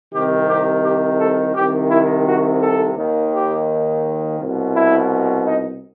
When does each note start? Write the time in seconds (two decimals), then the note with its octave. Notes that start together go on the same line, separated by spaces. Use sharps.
0.13 C2 C3 D#3 G4
0.49 G4
0.84 G4
1.19 A4
1.55 C2 C3 D#3 G4
1.90 E4
2.27 F#4
2.62 A4
2.97 D#2 D#3
3.33 G4
4.40 C2 B2
4.75 E4
5.46 D#4